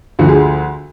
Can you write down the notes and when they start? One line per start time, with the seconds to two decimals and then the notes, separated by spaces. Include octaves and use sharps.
0.19 D2 D3 F3 F#4
0.28 G#4